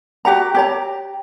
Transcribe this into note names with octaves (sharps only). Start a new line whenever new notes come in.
F#4 G4 F#5 A#5
G4 C#5 A#5